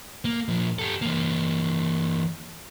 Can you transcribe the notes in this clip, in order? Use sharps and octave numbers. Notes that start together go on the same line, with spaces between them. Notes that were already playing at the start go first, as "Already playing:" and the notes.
A#3
A#2 F3
G4 A4
E3 A#3